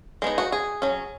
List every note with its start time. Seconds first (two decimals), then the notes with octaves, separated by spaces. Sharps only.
0.22 G#3 B3 D#4
0.38 F#4
0.52 G#4
0.82 F#3 C#4